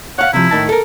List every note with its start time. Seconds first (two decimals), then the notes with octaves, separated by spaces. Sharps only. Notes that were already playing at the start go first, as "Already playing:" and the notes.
0.18 C#5 F5 F#5
0.33 C3 F3 E4
0.51 A2 D#3 A5
0.69 A4 A#4